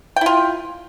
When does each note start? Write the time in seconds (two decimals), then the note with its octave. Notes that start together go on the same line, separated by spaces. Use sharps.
0.16 G5
0.21 E4
0.26 F4